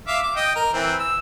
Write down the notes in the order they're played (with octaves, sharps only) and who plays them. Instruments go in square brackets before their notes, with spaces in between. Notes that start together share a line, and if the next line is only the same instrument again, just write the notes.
[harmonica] E5 F5 D6
D6
D#5 G5
A#4
E3 C4
E6